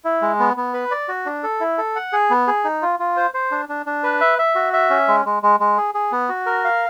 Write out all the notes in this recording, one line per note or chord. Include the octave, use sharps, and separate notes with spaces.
E4
G#3
B3
B3
B4
D5
F#4
D4
A4
E4
A4
F#5
G#4
B3
G#4
D#4
F4
F4
C5
C5
D4
D4
D4
B4
E5
E5
F#4
E5
C#4
G#3
G#3
G#3
G#3
G#4
G#4
B3
F#4
A#4
F5